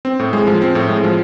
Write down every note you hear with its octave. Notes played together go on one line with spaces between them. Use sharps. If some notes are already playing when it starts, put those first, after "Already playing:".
C4
A2
G#3
F3
C4
A2
G#3
F3